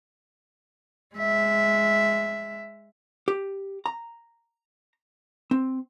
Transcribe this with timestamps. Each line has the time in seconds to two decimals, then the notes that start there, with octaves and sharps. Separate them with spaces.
1.16 G#3 E5
3.28 G4
3.86 A#5
5.51 C4